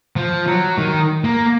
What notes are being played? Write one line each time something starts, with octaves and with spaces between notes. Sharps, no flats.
F3
F#3
D#3
A#3